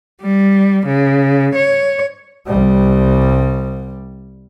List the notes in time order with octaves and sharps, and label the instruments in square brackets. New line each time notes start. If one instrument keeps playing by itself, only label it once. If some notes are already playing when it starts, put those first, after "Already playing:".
[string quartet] G3
C#3
C#5
[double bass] C2 G3